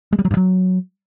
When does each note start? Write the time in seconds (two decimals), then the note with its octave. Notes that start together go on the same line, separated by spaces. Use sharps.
0.13 G#3
0.19 G3
0.25 F#3
0.31 G2
0.37 F#3